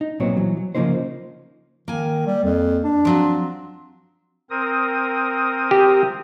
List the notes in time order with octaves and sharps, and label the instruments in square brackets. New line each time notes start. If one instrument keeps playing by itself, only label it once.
[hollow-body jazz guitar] D#4
B1 A#2 F#3 B3 C4 C#5
E3 F#3
F#3
C#3 F3 A#3 D#4 C5
[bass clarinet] D#3 [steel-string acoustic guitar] A#3 G#5
[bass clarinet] G3
F2
D4
[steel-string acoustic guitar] F3 F#3 C4
[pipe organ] C4 A#4 D#6
[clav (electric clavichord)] G4